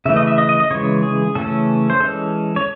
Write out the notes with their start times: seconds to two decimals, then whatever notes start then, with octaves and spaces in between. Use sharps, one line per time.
0.05 C#3 E3 A3 E5
0.16 D#5
0.27 E5
0.38 D#5
0.49 D#5
0.60 D#5
0.70 C#3 E3 G#3 C#5
1.03 G#4
1.35 C#3 E3 A3 C#4 A4
1.90 C5
2.00 E3 G#3 C#4 A4
2.56 C#5